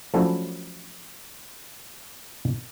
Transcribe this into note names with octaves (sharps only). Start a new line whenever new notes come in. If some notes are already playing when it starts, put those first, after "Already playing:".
F3 F#3 A3 C#4 D4 E4